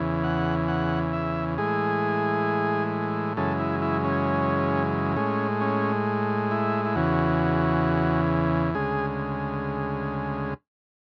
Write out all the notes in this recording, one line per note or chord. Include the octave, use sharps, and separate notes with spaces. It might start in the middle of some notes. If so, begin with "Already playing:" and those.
Already playing: E2 C#3 E3
F#5
F#5
E5
A2 E3 G#3 G#4
F#2 C#3 E3 G#3 A4
E4
E4
C#4
A2 G#3 C#4
C#4
E4
E4
E2 C#3 E3 F#4
D2 C#3 G#3 G#4